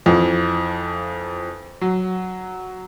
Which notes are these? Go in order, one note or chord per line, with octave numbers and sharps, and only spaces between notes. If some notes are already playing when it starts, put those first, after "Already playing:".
F2 E3 F3
F#3